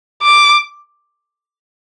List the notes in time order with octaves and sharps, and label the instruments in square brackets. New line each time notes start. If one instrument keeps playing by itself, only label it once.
[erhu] D6